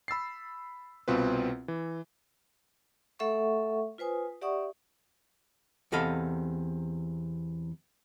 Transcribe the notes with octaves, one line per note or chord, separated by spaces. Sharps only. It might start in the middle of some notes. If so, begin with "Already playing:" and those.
B5 E6 A6 C7
C2 B2 C4 F4 B4
E3
A3 A4 E5 F#5 C#6
F4 B4 C5 G#5 D#6
G4 D5 E5 F#5 C#6 D#6
E2 C3 A4 D#5 F5 B5